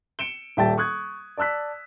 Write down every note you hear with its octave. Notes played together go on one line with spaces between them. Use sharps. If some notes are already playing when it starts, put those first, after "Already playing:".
C#7 D7 E7 G7
D#1 G3 E5 G5 A5 A6
C#6 D#6 F#6 G#6
D5 A5 E6 F#6 B6